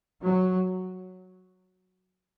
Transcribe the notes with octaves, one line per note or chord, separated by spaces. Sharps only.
F#3